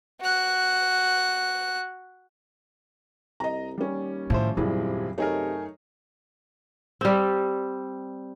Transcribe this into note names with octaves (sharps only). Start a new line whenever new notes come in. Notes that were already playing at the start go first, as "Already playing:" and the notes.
F#4 F#6
C2 D#5 A#5
D#2 G3 C#4
A2 D#3 F3 E4 C5
D#1 F#2 C3 G3 E4 G#4
C3 A3 D#4 G#4 A#4 C#5
G3 C4